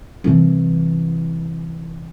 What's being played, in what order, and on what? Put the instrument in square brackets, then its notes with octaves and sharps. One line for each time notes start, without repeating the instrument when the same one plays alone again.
[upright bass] C2 E3